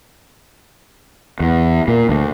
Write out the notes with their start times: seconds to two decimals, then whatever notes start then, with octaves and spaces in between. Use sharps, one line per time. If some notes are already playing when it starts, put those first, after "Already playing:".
1.40 E2
1.88 A#2
2.09 D2